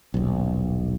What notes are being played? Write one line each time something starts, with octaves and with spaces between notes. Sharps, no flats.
D#1 B1